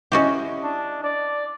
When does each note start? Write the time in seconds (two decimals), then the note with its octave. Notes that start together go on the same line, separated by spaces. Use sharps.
0.12 C#4 E4 F#4 G4 D#5
0.63 D4
1.04 D5